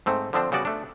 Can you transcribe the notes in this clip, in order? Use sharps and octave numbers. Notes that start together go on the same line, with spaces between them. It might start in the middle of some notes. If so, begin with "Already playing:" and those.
G#2 A3 C4
D3 F3 C4 D4
C#3 G3 B3 F#4 D5
A3 D4